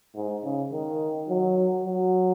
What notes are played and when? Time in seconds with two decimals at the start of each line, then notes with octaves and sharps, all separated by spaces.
0.15 G#2
0.43 C#3
0.72 D#3
1.29 F#3
1.85 F#3